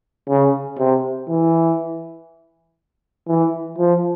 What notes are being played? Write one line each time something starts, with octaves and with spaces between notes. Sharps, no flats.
C#3
C3
E3
E3
F3